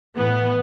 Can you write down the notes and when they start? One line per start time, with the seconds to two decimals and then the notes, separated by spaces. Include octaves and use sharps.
0.16 A2 E3 B3